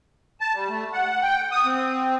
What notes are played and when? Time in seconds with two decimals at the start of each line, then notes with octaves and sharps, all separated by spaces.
0.41 A5
0.55 G3
0.69 A3
0.93 F#5
1.23 G5
1.52 D#6
1.65 C4